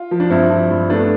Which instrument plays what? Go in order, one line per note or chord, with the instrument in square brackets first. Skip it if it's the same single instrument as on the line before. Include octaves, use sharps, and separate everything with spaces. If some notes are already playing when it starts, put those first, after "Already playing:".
Already playing: [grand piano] F4
[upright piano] F3
[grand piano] D4
[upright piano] G2 [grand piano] C4 E4
[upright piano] F3
G2
[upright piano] A3 [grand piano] B3 D4